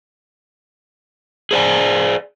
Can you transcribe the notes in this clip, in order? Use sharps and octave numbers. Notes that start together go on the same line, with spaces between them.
G#4 C5 D5 G#5